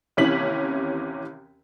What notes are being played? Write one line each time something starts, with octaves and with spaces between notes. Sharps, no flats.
D#2 C3 E3 C#4 B6 F#7